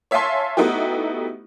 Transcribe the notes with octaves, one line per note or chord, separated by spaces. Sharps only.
C#5 E5 F5 G#5 A5 C6
A3 B3 D#4 E4 F#4 G4